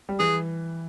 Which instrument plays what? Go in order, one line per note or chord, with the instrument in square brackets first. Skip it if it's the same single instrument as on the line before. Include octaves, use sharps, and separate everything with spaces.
[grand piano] G3
[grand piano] E3 [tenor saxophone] G#4